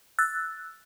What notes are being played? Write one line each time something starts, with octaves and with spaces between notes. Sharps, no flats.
E6 F#6 A6